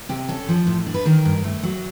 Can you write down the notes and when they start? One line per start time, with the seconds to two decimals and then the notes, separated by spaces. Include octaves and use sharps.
0.09 C3 G4
0.29 C#4 A4
0.49 F3
0.67 A2
0.86 D4
0.94 B4
1.06 D#3 A#4
1.25 G2
1.44 A3
1.63 F#3